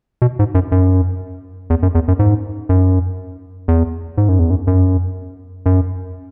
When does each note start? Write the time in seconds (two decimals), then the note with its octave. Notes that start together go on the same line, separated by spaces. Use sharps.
0.22 B2
0.39 G#2
0.55 F#2
0.72 F#2
1.70 E2
1.83 F#2
1.95 E2
2.08 F#2
2.19 G#2
2.69 F#2
3.68 E2
4.18 G#2
4.29 F#2
4.39 E2
4.50 F#2
4.67 F#2
5.66 F#2